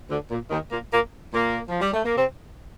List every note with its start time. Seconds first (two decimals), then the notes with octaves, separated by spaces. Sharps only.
0.10 D2 D3
0.30 A#2
0.50 D#2 D#3
0.71 A#2 A#3
0.92 A#2 A#3
1.33 A#2 A#3
1.69 F3
1.81 G3
1.93 A3
2.04 A#3
2.16 C3 C4